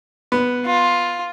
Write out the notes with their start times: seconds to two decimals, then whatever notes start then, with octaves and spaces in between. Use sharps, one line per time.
0.32 B3
0.66 F4